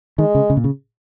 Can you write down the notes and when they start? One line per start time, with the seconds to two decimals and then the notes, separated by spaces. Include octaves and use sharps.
0.18 D#3 G#3
0.35 C#3
0.50 C#3
0.57 A#2
0.64 C#3